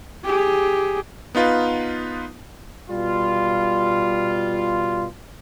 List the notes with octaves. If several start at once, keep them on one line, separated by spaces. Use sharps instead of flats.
G4 G#4
B3 D#4 F4 B4 F5
B2 G3 F4